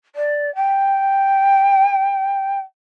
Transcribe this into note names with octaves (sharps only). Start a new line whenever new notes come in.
D5
G5